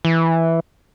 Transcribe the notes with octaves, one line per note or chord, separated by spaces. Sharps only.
E3